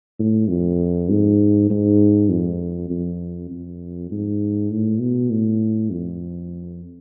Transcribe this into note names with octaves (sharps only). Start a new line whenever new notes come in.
A2
F2
G#2
G#2
F2
F2
F2
G#2
A2
B2
A2
F2